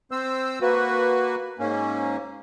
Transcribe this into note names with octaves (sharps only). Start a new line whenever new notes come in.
C4 C5 E6
A#3 F#4 B4
G#2 A#3 C#4